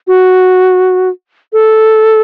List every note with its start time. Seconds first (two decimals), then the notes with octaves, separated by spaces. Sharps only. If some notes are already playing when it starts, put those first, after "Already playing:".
0.07 F#4
1.53 A4